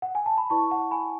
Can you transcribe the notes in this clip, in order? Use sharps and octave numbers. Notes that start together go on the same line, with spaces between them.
F#5
G#5
A5
B5
E4 B4 D5 A5 C#6
F#5 A5
G#5 B5